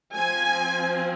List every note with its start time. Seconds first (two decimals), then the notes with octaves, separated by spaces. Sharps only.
0.15 F3 C4 G#5